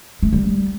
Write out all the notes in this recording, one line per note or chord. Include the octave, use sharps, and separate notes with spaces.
A3
G3